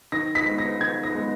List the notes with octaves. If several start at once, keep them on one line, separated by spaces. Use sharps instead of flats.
D#3 A#6
B6
G#3 B3
A#6
D#3 G#6
A#6
G#3 B3